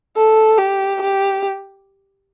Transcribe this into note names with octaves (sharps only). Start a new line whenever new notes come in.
A4
G4
G4